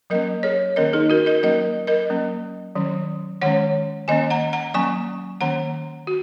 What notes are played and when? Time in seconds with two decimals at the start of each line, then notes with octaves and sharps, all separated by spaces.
0.10 F#3 A#3 C#4 A#4 D#5
0.43 G#4 C#5
0.76 D#3 A#3 C#4 A#4 D#5
0.93 D#4 G#4
1.10 F#4 A#4
1.26 A#4 D#5
1.43 F#3 A#3 C#4 A#4 D#5
1.87 A#4 D#5
2.10 F#3 A#3 C#4
2.76 D#3 F#3 C#4
3.42 D#3 G#3 C#4 C#5 F#5
4.08 D#3 A#3 C#4 D#5 G#5
4.30 F#5 A#5
4.53 F#5 A#5
4.74 F#3 A#3 C#4 G#5 C#6
5.41 D#3 A#3 C#4 F#5 A#5
6.07 F#4